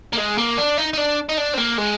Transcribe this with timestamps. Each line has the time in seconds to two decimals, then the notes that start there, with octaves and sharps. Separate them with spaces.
0.13 A#3
0.18 G#3
0.38 A#3
0.58 D4
0.78 D#4
0.93 D#4
0.98 D4
1.29 D#4
1.37 D4
1.54 C4
1.58 A#3
1.78 G#3